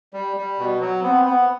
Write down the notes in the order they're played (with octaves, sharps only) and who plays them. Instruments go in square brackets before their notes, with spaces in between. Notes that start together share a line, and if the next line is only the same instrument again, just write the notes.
[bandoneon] G3
G3
B2
F#3
[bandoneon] B3 [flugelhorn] C4
[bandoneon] B3